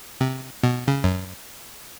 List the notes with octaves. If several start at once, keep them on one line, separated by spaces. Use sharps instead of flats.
C3
B2
C#3
F#2